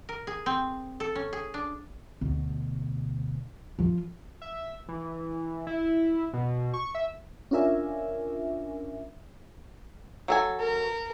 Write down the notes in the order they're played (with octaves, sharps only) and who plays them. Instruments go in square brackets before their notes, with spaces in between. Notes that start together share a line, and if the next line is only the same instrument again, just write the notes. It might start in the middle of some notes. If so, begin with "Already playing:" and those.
[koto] A#4
G#4
C4
A4
C#4
G#4
D4
[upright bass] D2 B2
F3 F4
[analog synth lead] E5
E3
E4
B2
C#6
E5
[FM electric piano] C#4 D4 F4 A#4 E5 G#5
[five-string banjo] F#3 A4 G#5
[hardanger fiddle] A#4